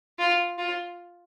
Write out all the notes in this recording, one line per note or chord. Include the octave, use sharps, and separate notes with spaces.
F4
F4